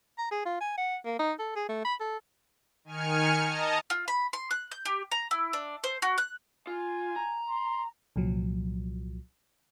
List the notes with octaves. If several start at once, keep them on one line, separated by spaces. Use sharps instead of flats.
A#5
G#4
F4
G#5
F#5
A#3
D#4
A4
G#4
A3
B5
A4
D#3 G#5 F6 C#7
D#5 A5 A#5 D#6
F4
B5
C6
F#6
G6
G4
A#5
E4
D4
C5
F#4
F#6
F4 G#5
A#5
C6
C2 A#2 F3 F#3